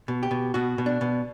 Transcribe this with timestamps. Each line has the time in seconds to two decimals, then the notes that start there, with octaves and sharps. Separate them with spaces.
0.08 B2
0.23 G4
0.31 B2
0.54 B2 F#4
0.78 B2
0.86 D4
1.01 B2